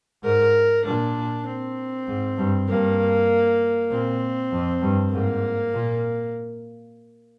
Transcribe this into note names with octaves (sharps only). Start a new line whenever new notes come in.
G#2 A#4
A#2 D4
C4
G#2
G2
G2 A#3
A#2 C4
F2
G2
G#2 A#3
A#2